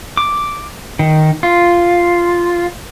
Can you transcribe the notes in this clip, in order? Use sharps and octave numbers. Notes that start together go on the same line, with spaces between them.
D6
D#3
F4